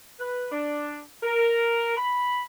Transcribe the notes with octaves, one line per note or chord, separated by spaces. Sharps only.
B4
D4
A#4
B5